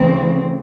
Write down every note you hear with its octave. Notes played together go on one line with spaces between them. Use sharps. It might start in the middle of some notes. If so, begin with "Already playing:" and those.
Already playing: D2 C#3 E3 C4